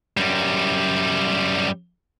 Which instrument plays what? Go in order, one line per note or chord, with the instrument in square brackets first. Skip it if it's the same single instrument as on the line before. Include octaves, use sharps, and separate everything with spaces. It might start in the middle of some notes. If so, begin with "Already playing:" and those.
[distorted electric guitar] F#2 G3